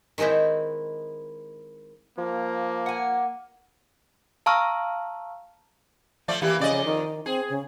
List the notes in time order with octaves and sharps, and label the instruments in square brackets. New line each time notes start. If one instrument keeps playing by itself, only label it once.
[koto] D#3 G#3 C4 D#4 E4
[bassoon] F3 [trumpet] A#3
[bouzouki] F#5 G#5
[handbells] F5 A5 A#5 C#6 E6 F6
[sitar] F3 A3 D5
[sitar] E3 A#3 B3 [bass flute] G4
[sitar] F2 D5 D#5 [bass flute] C#3
[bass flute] D#3
[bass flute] C4 [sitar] G#4
[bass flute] C#3